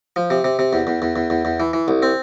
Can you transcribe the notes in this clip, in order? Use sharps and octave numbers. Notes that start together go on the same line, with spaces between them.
F3
C3
C3
C3
E2
E2
E2
E2
E2
E2
E3
E3
C2
C4